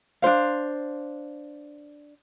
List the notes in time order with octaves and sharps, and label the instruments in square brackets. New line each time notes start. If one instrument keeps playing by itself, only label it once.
[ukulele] D4 D#4 C5 F5